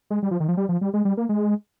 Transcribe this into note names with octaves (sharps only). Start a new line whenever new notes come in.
G#3
G3
F3
D#3
F3
G3
F3
G3
G#3
G3
A#3
G#3